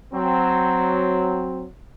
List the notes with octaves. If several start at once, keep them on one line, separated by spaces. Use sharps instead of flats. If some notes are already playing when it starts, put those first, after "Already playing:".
F#3 C4